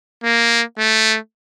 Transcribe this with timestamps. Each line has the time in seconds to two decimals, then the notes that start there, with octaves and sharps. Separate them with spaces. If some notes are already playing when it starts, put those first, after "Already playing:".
0.24 A#3
0.79 A3